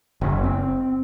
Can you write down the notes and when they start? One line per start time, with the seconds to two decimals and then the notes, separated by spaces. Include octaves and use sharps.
0.21 F#1
0.43 C4